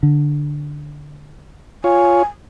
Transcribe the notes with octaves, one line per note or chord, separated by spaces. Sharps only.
D3
F4 C#5 G#5